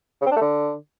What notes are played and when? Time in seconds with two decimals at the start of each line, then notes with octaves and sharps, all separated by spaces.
0.21 C#3
0.26 C4
0.31 D4
0.36 A3
0.41 D3